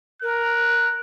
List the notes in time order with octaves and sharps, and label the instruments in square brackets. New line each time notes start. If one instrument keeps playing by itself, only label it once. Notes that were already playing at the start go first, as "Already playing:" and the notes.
[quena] A#4 [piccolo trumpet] F#6